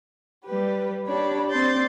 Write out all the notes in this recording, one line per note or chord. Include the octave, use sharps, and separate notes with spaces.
G3 G4 B4
D4 G4 C#5 B5
C4 D5 C6 G6 A6